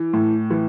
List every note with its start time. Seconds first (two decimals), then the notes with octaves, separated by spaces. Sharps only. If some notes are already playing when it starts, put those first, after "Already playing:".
Already playing: E3
0.13 A2
0.51 E3